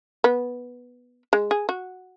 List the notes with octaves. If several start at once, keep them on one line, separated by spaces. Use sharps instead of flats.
B3
G#3
G#4
F#4